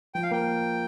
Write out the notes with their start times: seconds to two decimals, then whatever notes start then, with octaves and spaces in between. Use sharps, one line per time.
0.14 F3 G5
0.23 F5
0.31 A#3 G5